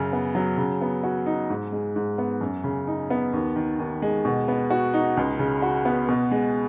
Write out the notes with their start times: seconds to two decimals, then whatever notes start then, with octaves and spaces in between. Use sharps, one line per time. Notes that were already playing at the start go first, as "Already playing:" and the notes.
Already playing: F#2 C#3
0.13 B3
0.35 F#3
0.58 C#3
0.82 B3
1.03 F#4
1.26 D#4
1.50 G#2
1.72 G#3
1.96 G#2
2.18 B3
2.41 F#2
2.64 C#3
2.87 D#4
3.10 B3
3.33 D#2
3.56 D#3
3.79 D#2
4.02 G#3
4.25 B2
4.48 B3
4.70 F#4
4.94 D#4
5.17 C#2
5.39 C#3
5.62 F#4
5.85 B3
6.09 B2
6.31 G#3